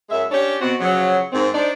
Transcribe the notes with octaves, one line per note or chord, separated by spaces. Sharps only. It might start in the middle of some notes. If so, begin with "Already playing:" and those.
F#2 G#3 E5
C#4 D4 G4 C#5
B2 C4 F#4
C#3 F3 F#3
G#2 D#3 C4
D4 D#4 C5 D5